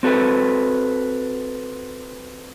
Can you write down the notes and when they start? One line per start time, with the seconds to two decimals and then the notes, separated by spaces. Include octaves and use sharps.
0.03 C4 F#4 A4 B4